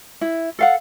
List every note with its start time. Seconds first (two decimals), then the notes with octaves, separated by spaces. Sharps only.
0.21 E4
0.59 A4 F5 F#5